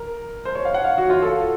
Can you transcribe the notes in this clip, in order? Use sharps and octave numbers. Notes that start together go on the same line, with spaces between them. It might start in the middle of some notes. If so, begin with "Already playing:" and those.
Already playing: A#4
C5
C#5
F5
F#5
F5
F#4
F4
A4